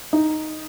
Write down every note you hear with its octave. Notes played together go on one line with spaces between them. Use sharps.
D#4